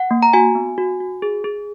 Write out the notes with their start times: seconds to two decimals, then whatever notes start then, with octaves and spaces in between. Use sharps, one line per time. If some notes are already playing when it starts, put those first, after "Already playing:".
Already playing: F#5
0.11 A#3
0.23 A#5
0.33 F#4 G#5
0.55 B3
0.78 F#4
1.00 F#4
1.22 G#4
1.44 G#4